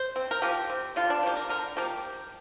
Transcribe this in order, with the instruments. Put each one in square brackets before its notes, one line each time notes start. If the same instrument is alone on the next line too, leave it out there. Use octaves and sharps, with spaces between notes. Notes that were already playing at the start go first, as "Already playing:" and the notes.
Already playing: [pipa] C5
C4
A#4
F3 G4
C4
D3 F4
D4
F3 A#3 G4
A#4
D3 A#4
F3 A#3 G4